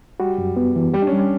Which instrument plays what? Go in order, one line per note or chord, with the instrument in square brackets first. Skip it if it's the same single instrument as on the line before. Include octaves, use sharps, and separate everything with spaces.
[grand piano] G3 [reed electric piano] F#4
[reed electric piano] F#2
B3
E3
[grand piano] G3 [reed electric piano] G4
[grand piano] D4
C#4
[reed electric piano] G3
[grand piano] C#4